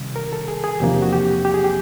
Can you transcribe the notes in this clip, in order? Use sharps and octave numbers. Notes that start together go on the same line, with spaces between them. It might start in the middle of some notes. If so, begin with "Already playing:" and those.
Already playing: C3 D#3 G3
A#4
A4
G#4
G#4
E2 C3 F3 A#3 D4 G4
F#4
G4
G4
G#4
G4